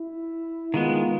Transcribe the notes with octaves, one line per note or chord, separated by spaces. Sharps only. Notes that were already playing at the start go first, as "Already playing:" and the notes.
Already playing: E4
D#3 G#3 B3 F4